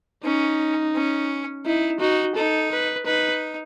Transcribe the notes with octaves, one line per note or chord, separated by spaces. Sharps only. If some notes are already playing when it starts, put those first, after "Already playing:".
C#4 D#4
C#4
D#4 E4
D#4 F#4
D#4 A4
B4
D#4 B4